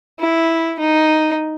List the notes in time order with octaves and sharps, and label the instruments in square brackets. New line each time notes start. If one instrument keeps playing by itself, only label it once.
[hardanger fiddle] E4
D#4